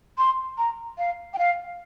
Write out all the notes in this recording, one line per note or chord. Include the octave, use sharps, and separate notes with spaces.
C6
A#5
F5
G5
F5